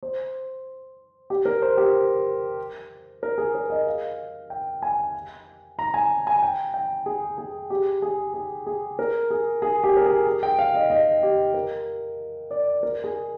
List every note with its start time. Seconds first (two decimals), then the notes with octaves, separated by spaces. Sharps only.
0.03 C5
1.30 G4
1.45 A#4
1.62 C5
1.77 G4
3.23 A#4
3.38 G#4
3.55 A#4
3.70 D#5
3.87 F5
4.50 G5
4.83 G#5
5.79 A#5
5.94 G#5
6.27 G#5
6.42 G5
6.74 G5
7.06 G#4
7.38 G#4
7.70 G4
8.02 G#4
8.34 G#4
8.67 G#4
8.99 A#4
9.31 G#4
9.62 G#4
9.84 G4
9.97 A#4
10.06 G#4
10.26 G#4
10.43 G5
10.59 F5
10.75 D#5
10.90 D#5
11.23 G4
11.54 A#4
12.51 D5
12.83 A#4
13.04 G#4